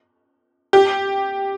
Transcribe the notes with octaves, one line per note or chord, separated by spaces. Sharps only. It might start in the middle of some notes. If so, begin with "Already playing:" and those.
G4